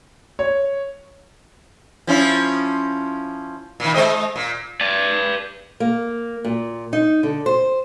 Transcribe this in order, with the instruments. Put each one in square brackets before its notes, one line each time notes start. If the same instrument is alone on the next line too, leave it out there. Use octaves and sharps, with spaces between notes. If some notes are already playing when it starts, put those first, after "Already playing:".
[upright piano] C#5
[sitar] F3 C#4 E4
A#2 D#3
G#3 C5 D#5
A#2
[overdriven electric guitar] B4 D5
[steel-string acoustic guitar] A#3
A#2
D#4
D3
C5